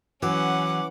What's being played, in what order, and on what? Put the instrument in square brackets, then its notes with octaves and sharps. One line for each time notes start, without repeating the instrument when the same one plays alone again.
[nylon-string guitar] E3 [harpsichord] F#3 [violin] C#4 F#5 [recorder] D6